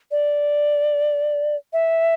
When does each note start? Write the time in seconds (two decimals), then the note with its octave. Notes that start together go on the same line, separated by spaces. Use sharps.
0.11 D5
1.73 E5